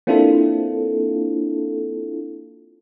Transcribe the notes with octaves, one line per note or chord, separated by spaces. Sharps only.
A#3 C4 D4 E4 F4 A4